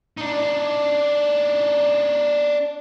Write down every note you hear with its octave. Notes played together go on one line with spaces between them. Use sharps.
D4 D#4